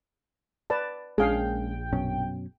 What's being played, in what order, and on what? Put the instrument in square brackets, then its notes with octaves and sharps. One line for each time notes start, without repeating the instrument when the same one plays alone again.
[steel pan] B4 D5 A5
[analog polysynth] A#1 G5 [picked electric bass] G#3 C#4 D4 [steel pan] G#4 F5
[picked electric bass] F#2 B2 C#4